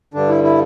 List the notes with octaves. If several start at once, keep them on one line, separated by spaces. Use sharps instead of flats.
G2 D3 D4
E4
E4